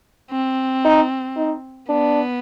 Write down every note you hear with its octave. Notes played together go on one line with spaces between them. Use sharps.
C4
D#4
D#4
B3 D4